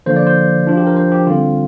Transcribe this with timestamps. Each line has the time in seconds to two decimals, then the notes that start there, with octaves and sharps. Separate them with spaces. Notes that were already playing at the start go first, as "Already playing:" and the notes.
0.06 D3 F3 A#3 C5
0.16 D5
0.27 C5
0.67 F3 D4 F4
0.77 G4
0.87 A#4
0.96 C5
1.12 G4
1.27 D3 G3 C4 F4